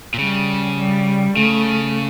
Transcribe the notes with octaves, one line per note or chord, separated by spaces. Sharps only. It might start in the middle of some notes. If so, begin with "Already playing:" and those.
A#2
C#3 G3
G3
C#3 A3